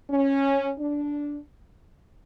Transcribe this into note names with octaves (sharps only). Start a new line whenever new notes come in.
C#4
D4